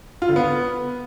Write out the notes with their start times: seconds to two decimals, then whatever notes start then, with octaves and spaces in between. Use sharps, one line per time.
0.22 F4
0.29 D3
0.36 B3